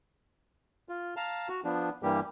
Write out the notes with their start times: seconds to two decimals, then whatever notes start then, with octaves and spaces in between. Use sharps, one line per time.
0.89 F4
1.17 F5 A5 A#5
1.49 F#4
1.64 F3 B3 D4
2.03 G2 E3 G3 A#3 G4